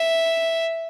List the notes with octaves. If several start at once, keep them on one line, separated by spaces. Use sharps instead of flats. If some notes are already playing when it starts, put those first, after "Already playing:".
Already playing: E5